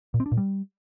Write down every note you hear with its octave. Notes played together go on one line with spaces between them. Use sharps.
A#2
C4
D4
A#2
G3